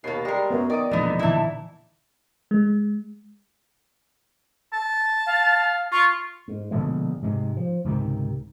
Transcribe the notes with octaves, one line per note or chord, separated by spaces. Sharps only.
D#2 B2 A#3 A5 C7
G3 G#3 A#4
F#2 B3
D#3 D5 A#5 D6 D#6
E1 A#1 D3 B3 D#4
A#2 D3 E3 E4 A5
G#3
A5
F5
F4 C#6
G#2
A#1 B2 D3 G#3
G#2 C3 G#3
F3
C#2 G#2 C3 D#3